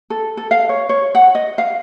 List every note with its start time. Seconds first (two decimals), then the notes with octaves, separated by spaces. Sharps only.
0.10 A4
0.37 A4
0.51 F5
0.69 C#5
0.89 C#5
1.15 F#5
1.35 D#5
1.58 F5